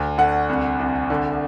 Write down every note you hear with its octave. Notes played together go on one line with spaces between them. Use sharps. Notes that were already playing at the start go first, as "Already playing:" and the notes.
Already playing: D2
D3 F#5
C2
C2
D3